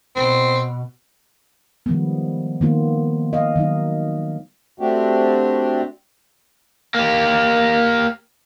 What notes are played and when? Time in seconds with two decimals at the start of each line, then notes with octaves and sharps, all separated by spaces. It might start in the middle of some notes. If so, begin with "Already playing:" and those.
0.16 B2 C4
1.86 D#3 F3 G3 G#3 B3
2.61 D#3 A#3 B3 F4
3.33 D#5 F5
3.56 D#3 F#3 D#4
4.79 A3 C4 D4 F#4 G4
6.95 A#3 G4